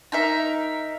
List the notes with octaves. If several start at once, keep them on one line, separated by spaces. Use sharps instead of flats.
D#4 A#4 E5